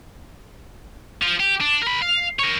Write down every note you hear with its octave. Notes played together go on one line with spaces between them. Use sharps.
F3
G4
D4
A#4 B5
F5
A#4 C#5